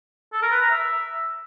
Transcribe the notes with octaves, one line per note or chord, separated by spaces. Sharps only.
A4
A#4
B4
A#5
E5